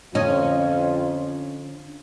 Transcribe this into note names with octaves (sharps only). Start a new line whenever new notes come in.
F2 D3 C#4 F4 D#5